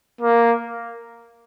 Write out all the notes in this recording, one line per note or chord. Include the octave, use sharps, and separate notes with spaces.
A#3